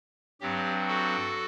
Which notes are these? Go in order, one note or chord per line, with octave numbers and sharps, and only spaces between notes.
G2 F#3 C4 G4
F#4 A4